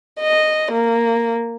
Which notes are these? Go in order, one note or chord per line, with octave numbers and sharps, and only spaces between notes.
D#5
A#3